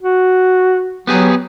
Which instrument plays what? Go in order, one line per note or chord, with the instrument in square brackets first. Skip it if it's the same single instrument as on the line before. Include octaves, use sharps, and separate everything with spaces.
[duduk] F#4
[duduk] F#3 [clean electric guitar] B3 G4 G#4